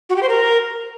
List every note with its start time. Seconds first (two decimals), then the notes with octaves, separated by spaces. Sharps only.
0.10 F#4
0.16 G4
0.23 C5
0.29 A#4